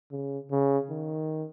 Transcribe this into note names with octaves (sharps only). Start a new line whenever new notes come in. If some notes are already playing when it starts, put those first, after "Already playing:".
C#3
C#3
D#3